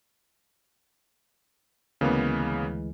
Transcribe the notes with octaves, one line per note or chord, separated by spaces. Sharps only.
D2 C#3 E3 G#3 A#3 B3